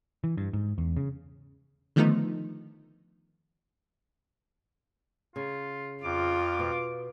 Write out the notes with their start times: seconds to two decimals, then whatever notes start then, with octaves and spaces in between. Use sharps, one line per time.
0.24 E3
0.38 G2
0.53 G#2
0.78 E2
0.97 C#3
1.96 D3 D#3 F3 A3 B3 D#4
5.36 C#3 F4
6.03 F2 F4 D6
6.59 B2